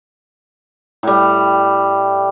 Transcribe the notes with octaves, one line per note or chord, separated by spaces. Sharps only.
A2 G3